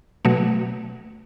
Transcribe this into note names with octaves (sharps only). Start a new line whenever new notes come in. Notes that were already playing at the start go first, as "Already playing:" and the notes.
B2 F#3 A3